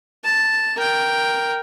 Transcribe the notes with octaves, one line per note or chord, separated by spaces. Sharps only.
A5
A#4 G5